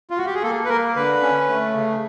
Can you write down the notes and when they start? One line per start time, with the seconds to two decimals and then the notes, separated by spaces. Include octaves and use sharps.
0.10 F4
0.18 F#4
0.26 G4
0.35 G#4
0.43 A#3 A4
0.65 B4
0.69 A#3 A#4
0.96 D3 B4
1.22 C#4
1.49 A3
1.74 C#3